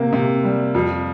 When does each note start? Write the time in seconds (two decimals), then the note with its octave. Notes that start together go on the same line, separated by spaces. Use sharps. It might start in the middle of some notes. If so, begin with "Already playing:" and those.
Already playing: C3 A#3
0.13 C3
0.44 G3
0.75 F2